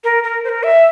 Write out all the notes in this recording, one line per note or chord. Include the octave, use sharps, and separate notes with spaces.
A#4
A#4
C5
A#4
E5